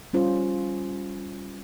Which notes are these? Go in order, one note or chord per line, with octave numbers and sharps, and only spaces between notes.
G3 C#4 F4 C5